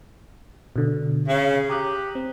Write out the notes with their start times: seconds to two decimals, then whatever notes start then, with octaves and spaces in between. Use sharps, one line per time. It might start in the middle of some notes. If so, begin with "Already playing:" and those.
0.76 B2 D3
1.28 C#3
1.69 G4 A#5 D#6 F#6
2.15 C4